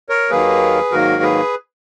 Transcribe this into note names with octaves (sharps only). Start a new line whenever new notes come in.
A#4 C#5
D#2 D#3 F#3 A#3 G#4 B4
G#2 D#3 F#3 A#3 F#4 A#4
G#4 B4